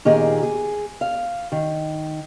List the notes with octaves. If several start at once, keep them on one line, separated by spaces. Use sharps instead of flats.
A#2 D#3 G4 G#4 D#5
G#4
F5
D#3